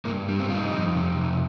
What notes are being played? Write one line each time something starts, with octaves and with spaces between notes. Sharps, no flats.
G2 A#3
G3
C4
G2 F4
D#4
F2
C3
F2